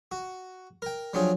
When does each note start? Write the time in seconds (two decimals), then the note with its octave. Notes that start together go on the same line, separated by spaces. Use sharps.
0.12 F#4
0.82 A#4 G5
1.14 F3 F#3 D4 F4 G4 G#4